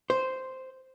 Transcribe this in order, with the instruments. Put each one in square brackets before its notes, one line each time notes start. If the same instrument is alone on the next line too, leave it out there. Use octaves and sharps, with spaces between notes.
[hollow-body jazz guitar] C5